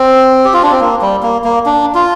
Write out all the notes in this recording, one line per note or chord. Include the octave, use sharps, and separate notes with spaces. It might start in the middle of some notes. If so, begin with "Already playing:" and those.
Already playing: C4
G4
F4
D4
C4
A#3
G3
A#3
A#3
D4
F4